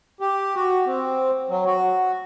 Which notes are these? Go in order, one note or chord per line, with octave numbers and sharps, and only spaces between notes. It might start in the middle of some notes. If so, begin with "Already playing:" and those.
G4
F#4
C4
F#3
F#4